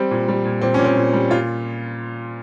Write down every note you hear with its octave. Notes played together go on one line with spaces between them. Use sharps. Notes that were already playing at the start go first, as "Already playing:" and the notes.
Already playing: G3 C4
A#2
G3
A#2
A#2 C4
A#2 C#4
C4
A#2
G3
A#2 F4